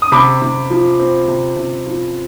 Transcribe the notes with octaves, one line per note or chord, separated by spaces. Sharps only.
D#6
C3 B5 D6
C3
F3
C4
C3
C3
F3